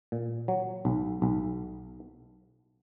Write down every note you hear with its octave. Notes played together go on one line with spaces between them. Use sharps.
A#2
F#3
B1
B1